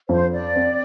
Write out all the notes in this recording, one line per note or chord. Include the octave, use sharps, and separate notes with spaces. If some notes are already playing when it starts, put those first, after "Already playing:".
F2 C5
D5
C4